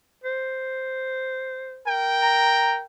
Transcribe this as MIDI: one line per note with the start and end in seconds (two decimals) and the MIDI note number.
0.24 1.83 72
1.87 2.84 70
1.87 2.84 79
2.22 2.74 82